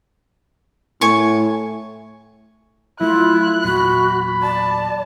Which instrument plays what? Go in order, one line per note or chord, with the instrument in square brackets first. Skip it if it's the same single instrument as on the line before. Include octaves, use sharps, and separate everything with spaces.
[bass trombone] A2 [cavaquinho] G#5 C#6
[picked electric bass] F#3 A3 [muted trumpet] E4 [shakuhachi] F4 [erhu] F#6
[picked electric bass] E2 A#2 F#3 [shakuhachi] F#4 [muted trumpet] B5
[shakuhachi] D5 [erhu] A5